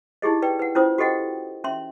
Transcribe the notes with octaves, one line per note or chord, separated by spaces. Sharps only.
D#4 E4 G4 G#4 D#5
B4 D5 G5
B4 F#5
C#4 E4 F4 C5 D#6
F#4 G4 A4 D#5 F#5 G5
C#4 E5 C6